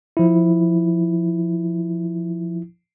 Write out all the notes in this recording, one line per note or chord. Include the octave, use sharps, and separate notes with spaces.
F3 E4